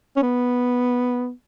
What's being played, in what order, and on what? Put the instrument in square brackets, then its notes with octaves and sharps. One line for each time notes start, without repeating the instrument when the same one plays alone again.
[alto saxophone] C#4
B3